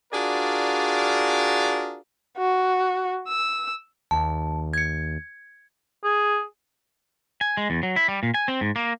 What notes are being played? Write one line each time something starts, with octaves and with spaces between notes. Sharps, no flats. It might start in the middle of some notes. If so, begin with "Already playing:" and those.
D4 F4 F#4 G#4 A#4 D5
F#4
E6
D#2 A5
G#6 C#7
G#4
G#5
G#3
E2
F#3
E4
G3
A#2
G#5
C4
G#2
A#3